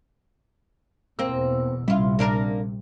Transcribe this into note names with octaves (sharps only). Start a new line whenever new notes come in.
E2 B2 A#3 C4 E6
A#1 C3 G3 E4 F4
A#3 D4 A#4